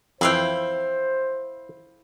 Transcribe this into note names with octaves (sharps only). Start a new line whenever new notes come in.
F2 E3 E4 C5 F5 G5